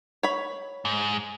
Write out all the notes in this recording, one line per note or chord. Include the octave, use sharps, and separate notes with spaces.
C#5 B5
G#2